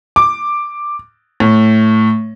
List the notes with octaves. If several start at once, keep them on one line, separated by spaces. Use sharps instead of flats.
D6
A2